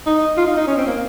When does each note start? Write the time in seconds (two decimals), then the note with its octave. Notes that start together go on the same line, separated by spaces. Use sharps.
0.06 D#4
0.37 F4
0.47 D#4
0.57 D#4
0.67 C#4
0.77 C4
0.87 A#3